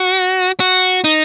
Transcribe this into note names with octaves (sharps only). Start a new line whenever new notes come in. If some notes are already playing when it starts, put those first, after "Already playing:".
Already playing: F#4
F#4
D#4